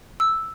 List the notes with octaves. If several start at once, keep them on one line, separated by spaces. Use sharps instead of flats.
E6